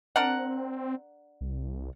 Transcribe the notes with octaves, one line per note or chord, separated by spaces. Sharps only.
C4 D4 A#4 F#5
C2